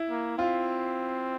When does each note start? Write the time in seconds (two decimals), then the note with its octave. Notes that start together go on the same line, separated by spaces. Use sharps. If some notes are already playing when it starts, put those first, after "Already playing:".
Already playing: E4 E5
0.10 A#3
0.38 C4 F4 F5